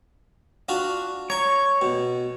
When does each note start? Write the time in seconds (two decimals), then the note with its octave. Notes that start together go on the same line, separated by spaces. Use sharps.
0.69 D4 F4 F#4
1.30 C#5 A#5 C#6
1.81 B2